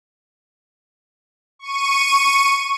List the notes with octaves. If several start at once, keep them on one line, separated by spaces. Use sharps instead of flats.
C#6 D#7